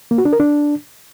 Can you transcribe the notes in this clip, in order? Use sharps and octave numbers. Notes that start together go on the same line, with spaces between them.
A#3
F#4
D4
A#4
D4